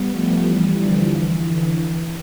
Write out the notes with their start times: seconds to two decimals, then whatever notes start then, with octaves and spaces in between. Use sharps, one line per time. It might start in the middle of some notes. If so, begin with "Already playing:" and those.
Already playing: G3 B3
0.11 F3 A3
0.44 E3 G3
0.79 D3 F3
1.12 E3
1.47 D3
1.81 E3